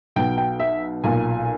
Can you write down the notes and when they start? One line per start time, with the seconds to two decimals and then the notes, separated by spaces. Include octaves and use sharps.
0.16 B1 B2 G5
0.38 G5
0.60 E5
1.04 B1 A#2 G#5